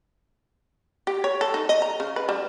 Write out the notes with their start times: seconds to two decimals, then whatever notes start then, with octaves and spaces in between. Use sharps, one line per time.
1.07 G4
1.24 C#5
1.41 A4
1.54 D#4
1.69 D#5
1.82 A#5
2.00 C#3
2.16 B4
2.29 G3